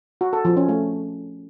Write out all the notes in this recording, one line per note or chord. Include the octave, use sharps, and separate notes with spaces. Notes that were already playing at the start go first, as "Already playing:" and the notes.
F#4
A4
F3
C#4
A3